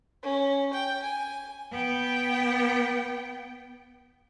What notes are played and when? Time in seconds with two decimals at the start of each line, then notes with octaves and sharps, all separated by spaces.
0.23 C#4
0.73 G5
1.02 G#5
1.72 B3 G5